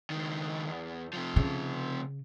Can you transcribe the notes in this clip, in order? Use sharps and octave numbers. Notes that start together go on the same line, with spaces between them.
C#2 D#3
E2
C3 F3
C#3